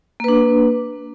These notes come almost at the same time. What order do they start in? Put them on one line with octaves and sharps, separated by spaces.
A#3 B4 D4